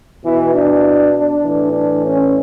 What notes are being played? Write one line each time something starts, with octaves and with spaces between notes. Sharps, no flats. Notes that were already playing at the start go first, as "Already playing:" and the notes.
B2 E3
D4
D4
A2 E3
D4
C#4